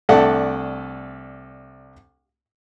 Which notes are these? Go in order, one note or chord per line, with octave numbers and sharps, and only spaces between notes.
C2 A3 D4 A4 F#5